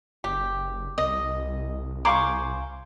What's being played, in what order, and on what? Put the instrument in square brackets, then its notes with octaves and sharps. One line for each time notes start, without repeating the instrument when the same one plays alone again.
[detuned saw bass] F#1 [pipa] G4
[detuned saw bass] C2 [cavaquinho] D#5
[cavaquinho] C5 [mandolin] F5 G#5 D6 [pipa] A#5 B5 C#6